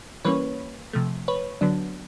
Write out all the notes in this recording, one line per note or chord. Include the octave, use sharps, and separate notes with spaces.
E3 G3 A#3 C#4 B4 C#5
C3 F3 A3
B4 C#5
D3 F#3 B3 D4